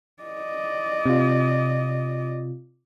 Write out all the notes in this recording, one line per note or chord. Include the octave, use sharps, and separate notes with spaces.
D5 D#5
C3 F4